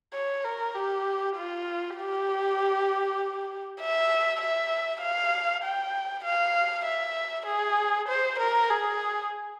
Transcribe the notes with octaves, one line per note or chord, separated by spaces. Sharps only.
C#5
A#4
G4
F4
G4
E5
E5
F5
G5
F5
E5
G#4
C5
A#4
G#4